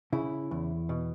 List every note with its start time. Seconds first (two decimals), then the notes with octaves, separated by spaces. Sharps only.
0.12 C#3 E4
0.51 E2
0.89 B2